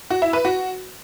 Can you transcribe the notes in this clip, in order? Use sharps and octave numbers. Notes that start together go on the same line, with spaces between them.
F#4
E4
B4
F#4